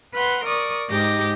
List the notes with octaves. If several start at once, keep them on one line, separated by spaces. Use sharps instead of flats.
B4 F#5 C6 F6
A#4 D5 C#6 D#6
G#2 D#4 G4 D6 A#6